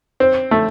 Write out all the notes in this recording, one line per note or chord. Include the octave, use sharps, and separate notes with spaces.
C4
A3